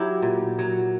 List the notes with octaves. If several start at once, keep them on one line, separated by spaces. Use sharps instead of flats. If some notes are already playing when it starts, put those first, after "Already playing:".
Already playing: F#3 E4 G4
A#2
F#3